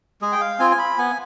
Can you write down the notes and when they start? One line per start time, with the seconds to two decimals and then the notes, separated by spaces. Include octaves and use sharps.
0.21 G#3 G#4
0.32 G5
0.41 F5
0.59 C4 F4 G#5
0.71 G#5
0.79 B5
0.98 B3 G#5